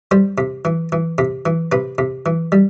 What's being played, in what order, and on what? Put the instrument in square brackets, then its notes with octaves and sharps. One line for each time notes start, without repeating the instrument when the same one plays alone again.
[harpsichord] G3 C5
C3
E3
E3
C3
E3
C3 B4
C3
E3
G3